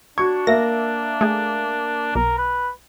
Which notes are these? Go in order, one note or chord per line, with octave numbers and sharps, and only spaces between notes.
D4 F#4 C#6 G#6
A#3 E5 A#6
A3 G#4
B1 A#4
B4